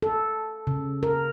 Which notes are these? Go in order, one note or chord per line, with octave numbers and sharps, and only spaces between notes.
A4
C#3
A#4